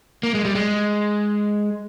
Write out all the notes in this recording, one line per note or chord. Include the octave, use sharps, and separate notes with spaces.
A#3
G#3
G3
G#3